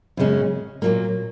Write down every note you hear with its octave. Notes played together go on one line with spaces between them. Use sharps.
F#2 C#3 G#3 C#4
A#2 F#3 A#3